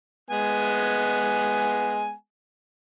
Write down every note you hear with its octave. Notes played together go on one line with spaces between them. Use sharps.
G#3 B3 G#5